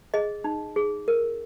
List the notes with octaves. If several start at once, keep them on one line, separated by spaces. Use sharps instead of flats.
G#4 D#5
D#4
G#4
A#4